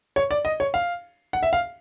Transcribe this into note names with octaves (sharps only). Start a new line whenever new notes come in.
C#5
D5
D#5
C#5
F5
F#5
E5
F5